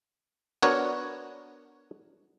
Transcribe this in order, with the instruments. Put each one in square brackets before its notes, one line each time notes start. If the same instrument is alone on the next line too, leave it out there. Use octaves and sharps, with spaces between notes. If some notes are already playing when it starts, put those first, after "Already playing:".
[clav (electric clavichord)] B3 D4 F#4 A#4 C#5